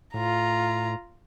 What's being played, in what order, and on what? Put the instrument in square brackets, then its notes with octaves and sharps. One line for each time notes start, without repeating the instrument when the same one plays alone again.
[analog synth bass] A2 [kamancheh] F4 A#5